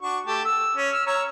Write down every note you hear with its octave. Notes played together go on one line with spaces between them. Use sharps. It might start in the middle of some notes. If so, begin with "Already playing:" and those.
D4 F#4 C#6
A3 G4 A5
E6
C#4
E6 F6
C#5 A#5 E6